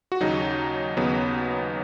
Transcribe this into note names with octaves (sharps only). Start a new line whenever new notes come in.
F#4
D#2 C#3 F#3 D#4
D#2 C#3 F#3 B3